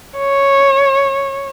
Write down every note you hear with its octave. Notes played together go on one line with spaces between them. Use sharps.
C#5